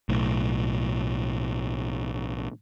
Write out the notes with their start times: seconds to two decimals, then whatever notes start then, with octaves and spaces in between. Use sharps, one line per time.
0.09 B1 A2